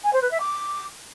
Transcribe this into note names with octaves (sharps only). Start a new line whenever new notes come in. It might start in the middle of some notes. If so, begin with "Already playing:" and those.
G#5
C5
B4
E5
D6